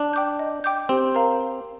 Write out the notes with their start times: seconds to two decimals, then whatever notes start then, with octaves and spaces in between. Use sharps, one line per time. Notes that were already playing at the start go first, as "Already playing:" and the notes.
Already playing: D4
0.13 G5 D6 G6
0.39 D#5
0.64 G5 D6 G6
0.89 C4 G4
1.15 A#4 F5 A#5